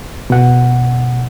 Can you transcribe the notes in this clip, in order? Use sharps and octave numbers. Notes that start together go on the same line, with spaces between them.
B2 F#5